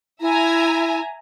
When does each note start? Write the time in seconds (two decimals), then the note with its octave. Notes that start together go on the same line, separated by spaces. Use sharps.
0.21 E4 E5 G#5 A#5